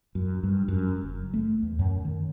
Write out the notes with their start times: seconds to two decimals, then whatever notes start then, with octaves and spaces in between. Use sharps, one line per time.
0.15 F#2
0.44 G2
0.68 F#2
1.03 F#1
1.34 A3
1.62 E2
1.79 F#2
2.05 D#3